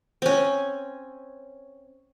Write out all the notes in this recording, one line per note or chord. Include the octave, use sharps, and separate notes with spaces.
C4 C#4